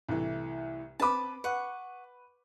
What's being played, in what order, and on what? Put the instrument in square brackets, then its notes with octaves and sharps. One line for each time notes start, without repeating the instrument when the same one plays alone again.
[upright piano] C2 A2 E3
[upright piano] C4 B4 D6 [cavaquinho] A5 B5
[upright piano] B4 [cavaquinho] F#5 C#6